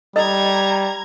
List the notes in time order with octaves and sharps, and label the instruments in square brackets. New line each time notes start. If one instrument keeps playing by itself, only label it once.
[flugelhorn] G3 [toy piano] A4 D#5 E6 [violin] A#5 G#6